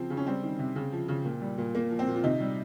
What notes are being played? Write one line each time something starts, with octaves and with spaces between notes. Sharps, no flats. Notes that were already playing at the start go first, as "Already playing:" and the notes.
Already playing: C#3 F3 C4
C#3
C#4
G3 C4
D#3
C3
C#3
F3
C#3
A#2
G3
A#2
A#2 A#3
F3
C4
A#2
F4
C3 D#4
G3